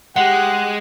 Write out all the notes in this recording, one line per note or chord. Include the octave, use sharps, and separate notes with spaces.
G#3 G4 F#5 F#6